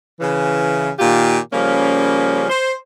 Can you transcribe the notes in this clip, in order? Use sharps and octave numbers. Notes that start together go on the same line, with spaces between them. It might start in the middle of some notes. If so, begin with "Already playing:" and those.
C#3 E3
A#2 D#3 F4 G4
C#3 F3 G3 A#3 C#4
C5